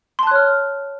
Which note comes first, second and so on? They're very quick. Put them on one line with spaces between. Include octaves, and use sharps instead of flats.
C6 A5 F#6 C#5 F6